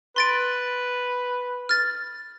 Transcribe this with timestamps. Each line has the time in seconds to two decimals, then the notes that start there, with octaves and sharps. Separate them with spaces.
0.16 B4 C6 A6 D7
1.69 F6 A6